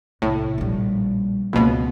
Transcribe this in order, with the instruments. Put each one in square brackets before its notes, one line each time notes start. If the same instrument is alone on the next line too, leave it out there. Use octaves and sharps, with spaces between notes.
[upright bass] C2 [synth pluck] A2
[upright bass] A#1 G3
[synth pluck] C#2 B2 [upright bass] A#3 C4